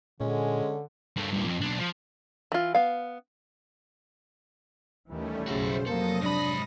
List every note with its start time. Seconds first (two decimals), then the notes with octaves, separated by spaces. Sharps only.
0.20 A#2 D3 G#3 C#4
1.16 G2 A3
1.33 G2 A#2
1.46 F2
1.62 B1 D4
1.79 F3
2.52 E3 F4
2.75 B3 F5
5.09 D#2 D#3 E3 G3 A3 C#4
5.48 B1 F#2 C#3 E4 F#4 C5
5.86 F2 C3 F#3 A#3 A4 D#6 A#6
6.22 G#2 D4 B5